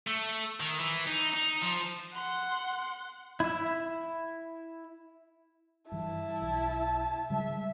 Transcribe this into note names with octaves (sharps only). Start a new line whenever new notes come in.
A3
D#3
E3
D#4
D#4
F3
F#5 C6
E4 E5
G2 E3 E4 A5
B1
C#3 G3 G#3 E5